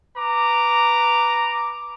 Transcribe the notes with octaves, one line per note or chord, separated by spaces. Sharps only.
B4 A#5 D6